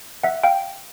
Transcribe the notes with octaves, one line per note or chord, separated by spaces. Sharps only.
E5 F#5
F5 G5